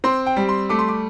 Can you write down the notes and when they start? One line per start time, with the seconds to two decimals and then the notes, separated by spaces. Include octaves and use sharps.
0.04 C4 C6
0.26 G5
0.36 G3
0.49 C6
0.69 A3 D6
0.79 C6
0.88 D6